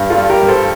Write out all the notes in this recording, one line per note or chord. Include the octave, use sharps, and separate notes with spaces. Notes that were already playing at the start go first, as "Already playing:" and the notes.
Already playing: G2
F4 A4
G3
G4 A#4
G2
A4 C5